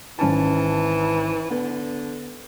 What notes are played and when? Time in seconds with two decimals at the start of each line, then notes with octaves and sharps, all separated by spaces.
0.19 G#1 E3 C#4 A5
1.50 D3 B3